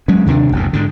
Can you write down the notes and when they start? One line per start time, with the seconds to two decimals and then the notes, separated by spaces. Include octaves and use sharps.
0.08 F#3 G#3 C#4
0.26 D#2 C3 G3 D4
0.52 F#1 D2 B2
0.73 G#2 D3